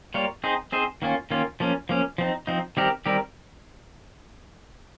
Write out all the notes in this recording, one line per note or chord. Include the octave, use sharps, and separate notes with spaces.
G3 A#3 F4 A#4 C#5
C4 D#4 G#4 C5
C4 D#4 G#4 C5
D#3 A#3 C#4 F4
D#3 A#3 C#4 F4
F3 A#3 C#4
F3 A#3 C#4
F3 C4 D#4
F3 C4 D#4
D#3 G3 C4 G4 A#4
D#3 G3 C4 G4 A#4